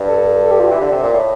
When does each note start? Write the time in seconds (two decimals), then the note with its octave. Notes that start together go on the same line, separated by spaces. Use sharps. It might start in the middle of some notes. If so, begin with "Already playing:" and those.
Already playing: G2
0.08 A4
0.26 A4
0.43 A4
0.51 G4
0.60 F4
0.67 E3 G4
0.81 D3
0.92 C3
1.03 A#2
1.13 A2